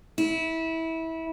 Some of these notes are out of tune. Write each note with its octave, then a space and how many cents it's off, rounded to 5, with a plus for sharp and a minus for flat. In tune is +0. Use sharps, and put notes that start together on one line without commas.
E4 -20